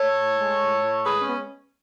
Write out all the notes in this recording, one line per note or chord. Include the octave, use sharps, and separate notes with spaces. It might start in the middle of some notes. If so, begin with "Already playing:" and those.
Already playing: A4 C#5
A2
G#3
A2
A2
G#3 G#4 B4
C#4
B3